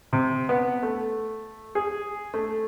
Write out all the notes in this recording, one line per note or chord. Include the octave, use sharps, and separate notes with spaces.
C3
B3
A3
G#4
A3